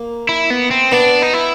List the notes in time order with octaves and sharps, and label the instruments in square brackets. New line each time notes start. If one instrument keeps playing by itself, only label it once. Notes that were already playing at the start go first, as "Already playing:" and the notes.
Already playing: [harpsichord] A#3
[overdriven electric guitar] E4
B3
C4
[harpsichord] B3 [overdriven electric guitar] D4
[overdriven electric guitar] D#4
E4